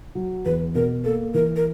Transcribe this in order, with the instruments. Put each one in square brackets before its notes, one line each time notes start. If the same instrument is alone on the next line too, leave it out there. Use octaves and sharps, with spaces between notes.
[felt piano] F#3
[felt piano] E2 [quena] B4
[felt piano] B2 [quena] A#4
[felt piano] A#3 [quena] A4
[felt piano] E3 [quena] A#4
[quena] A#4